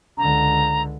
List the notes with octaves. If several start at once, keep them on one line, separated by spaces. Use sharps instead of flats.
C#2 D3 A#5